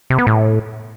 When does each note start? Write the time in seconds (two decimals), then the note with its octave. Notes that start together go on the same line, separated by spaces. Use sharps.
0.10 C3
0.18 B3
0.27 A2